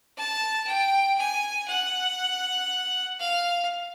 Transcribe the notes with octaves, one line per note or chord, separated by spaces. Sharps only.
A5
G5
G#5
F#5
F5